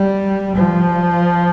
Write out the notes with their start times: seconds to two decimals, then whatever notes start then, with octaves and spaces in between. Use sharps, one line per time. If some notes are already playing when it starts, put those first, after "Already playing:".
Already playing: G3
0.56 F3